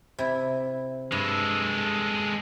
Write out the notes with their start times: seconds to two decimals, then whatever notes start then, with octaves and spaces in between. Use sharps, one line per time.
0.19 C3 E4
1.12 G2 G#3 A4